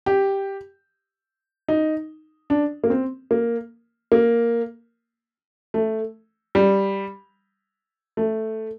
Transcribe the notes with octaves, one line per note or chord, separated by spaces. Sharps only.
G4
D#4
D4
A#3
C4
A#3
A#3
A3
G3
A3